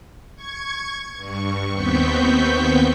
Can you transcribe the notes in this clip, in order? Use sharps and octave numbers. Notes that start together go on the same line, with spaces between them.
C#6 G#6
G2 C#6
D#2 B3 C4 C#6 G6 B6